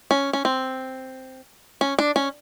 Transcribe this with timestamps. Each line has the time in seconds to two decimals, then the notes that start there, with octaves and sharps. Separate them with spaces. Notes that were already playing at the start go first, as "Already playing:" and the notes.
0.11 C#4
0.33 C#4
0.45 C4
1.81 C#4
1.99 D4
2.16 C#4